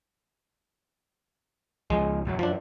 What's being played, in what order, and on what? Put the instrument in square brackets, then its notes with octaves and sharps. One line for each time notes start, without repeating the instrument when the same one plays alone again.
[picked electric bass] C#2 F3 [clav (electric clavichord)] G#3
[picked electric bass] E1 F#2 F#3
[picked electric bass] F#2 [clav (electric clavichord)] F3 D4